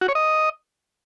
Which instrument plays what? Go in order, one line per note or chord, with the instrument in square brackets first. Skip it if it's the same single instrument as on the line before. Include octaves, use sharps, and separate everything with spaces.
[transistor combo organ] F#4
C#5
D#5